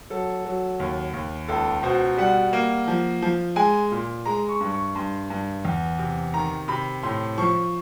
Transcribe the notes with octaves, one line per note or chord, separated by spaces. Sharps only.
F#3 A4
F#3
D#2
D#2
C#2 A4
B2 C5
G3 F#5
A#3
F3
F3
G#3 G#5
A#2
G#3 A#5
C#6
G2
C#6
G2 C6
G2
E2
C3
D#3 A#5
C3 B5
A2 C6
F3 C#6